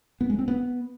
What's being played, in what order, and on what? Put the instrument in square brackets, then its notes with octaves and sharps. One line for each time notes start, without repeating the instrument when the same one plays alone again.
[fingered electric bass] B3
G#3
C4
B3